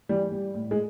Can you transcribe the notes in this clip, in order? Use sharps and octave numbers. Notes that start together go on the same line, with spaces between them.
E3 G3
G3
A2
G#3